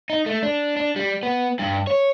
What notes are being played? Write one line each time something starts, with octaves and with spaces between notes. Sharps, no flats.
D#4
A3
D4
D4
G3
B3
G2
C#5